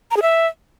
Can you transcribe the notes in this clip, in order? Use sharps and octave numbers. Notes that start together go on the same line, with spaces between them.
A#5
G#4
E5